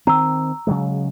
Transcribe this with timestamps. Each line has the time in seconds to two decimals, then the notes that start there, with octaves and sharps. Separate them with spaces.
0.07 D#3 C4 A#5 E6
0.67 C#3 F#3 G#3